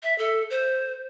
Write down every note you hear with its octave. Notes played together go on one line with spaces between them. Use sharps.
E5
A4
C5